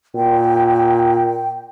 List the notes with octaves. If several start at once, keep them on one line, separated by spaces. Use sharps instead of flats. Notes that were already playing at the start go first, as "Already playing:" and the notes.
A#2 G5